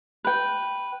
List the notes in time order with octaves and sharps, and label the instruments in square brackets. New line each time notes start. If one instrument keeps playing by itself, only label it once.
[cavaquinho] B4 G5